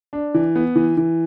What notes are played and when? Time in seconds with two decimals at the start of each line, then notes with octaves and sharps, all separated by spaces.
0.13 D4
0.34 E3
0.56 B3
0.76 E3
0.97 E3